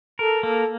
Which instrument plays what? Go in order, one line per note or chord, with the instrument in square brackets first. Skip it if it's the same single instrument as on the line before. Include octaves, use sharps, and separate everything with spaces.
[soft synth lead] A4 [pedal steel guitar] A#4
[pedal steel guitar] A#3 [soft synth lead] A4